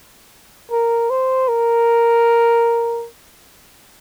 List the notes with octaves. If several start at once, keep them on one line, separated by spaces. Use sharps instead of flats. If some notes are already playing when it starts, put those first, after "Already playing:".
A#4
C5
A#4